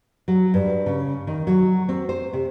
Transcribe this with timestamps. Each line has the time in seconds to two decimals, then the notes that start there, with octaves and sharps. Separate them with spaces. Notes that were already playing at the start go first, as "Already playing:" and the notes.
0.28 F#3
0.54 G2
0.86 C#3
1.27 D#3
1.47 F#3
1.89 C4
2.09 C5
2.33 C3